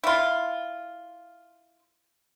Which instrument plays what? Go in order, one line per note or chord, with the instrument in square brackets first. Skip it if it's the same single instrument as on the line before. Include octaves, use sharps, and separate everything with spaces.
[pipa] E4 F4